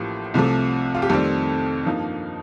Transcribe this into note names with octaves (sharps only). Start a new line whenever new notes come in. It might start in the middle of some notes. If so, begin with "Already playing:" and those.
Already playing: A1 A2 F3 A#3 G4
C2 C3 F3 A3
F4
G4
F2 D#3 G3 A3 C4 A4
G2 F3 A#3 D#4